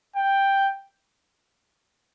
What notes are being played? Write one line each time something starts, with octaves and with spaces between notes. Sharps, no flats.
G5